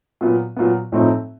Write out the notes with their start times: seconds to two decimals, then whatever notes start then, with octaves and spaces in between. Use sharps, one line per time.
0.21 A#2 F#3 B3
0.56 A#2 F#3 B3
0.92 A2 F3 A3 C4 D#4